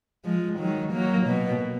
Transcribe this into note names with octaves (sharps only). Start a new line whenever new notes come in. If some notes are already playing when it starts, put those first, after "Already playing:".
F3 G#3
D#3 F#3
F#3 A#3
B2